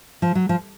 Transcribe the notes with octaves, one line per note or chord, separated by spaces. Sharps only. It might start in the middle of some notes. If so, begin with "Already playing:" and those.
F3
F#3
F3